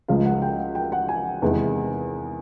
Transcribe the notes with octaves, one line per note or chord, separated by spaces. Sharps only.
C#2 C#3 F3 G#3 F5
F#5
G5
G5
F#5
G#5
E2 C3 D#3 G#3 B3